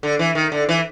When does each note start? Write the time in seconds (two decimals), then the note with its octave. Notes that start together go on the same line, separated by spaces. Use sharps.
0.03 D3
0.19 E3
0.35 D#3
0.52 D3
0.69 E3